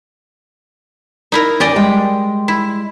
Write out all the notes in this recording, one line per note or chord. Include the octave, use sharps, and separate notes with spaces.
D#4 E4 A#4
D#3 C#4 G4 D5 D#5
G3 G#3 G5
E4